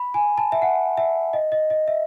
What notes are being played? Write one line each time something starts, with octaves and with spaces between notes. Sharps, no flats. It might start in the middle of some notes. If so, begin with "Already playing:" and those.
Already playing: B5
G#5
A5
E5
F#5
E5
D#5
D#5
D#5
E5